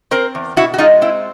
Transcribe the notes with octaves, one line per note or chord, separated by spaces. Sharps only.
C4 A#4 C5
E2
B2 E4 F#4
F#4
G#3 D#4 F4
C4 E4